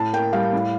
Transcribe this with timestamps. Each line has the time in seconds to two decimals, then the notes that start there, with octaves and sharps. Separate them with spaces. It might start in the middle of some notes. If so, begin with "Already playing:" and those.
Already playing: A2 A5
0.13 A#3 G5
0.33 G3 F5
0.53 A2